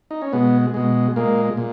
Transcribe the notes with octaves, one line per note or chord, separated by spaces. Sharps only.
D#4
C#4
B2 G#3 B3
B2 G#3
A#2 G#3 A#3
A#2